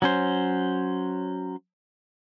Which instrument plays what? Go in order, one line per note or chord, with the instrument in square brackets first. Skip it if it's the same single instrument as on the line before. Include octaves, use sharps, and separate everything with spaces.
[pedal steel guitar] F#3 C#4 C5